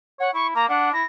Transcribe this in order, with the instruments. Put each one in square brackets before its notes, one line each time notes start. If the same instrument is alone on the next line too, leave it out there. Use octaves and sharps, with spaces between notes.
[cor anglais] C#5 [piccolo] F#5
[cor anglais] E4 [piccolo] C#6
[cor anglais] A#3 [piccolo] A#5
[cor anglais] D4 [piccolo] F#5
[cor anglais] E4 [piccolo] A#6